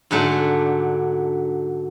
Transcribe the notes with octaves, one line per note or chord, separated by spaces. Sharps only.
G#2 D3 F#3 A3 D4